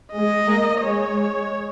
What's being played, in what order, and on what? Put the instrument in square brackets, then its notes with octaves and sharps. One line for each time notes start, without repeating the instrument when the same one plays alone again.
[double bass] G#3 [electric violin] D#5
[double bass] A#3
[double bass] G#3 [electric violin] C#5
[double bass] G#3